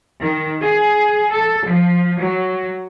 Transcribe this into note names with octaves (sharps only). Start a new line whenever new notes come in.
D#3
G#4
A4
F3
F#3